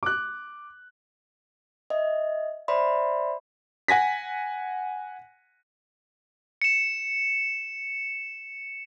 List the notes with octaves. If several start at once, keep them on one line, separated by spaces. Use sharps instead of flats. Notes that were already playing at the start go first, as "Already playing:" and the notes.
D6 F#6
D#5 E5
C5 D5 E5 B5 C6
F#5 G#5 A#6 B6
C#7 E7